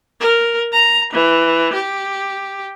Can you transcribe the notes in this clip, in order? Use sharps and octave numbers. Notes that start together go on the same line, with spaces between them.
A#4
A#5
E3
G4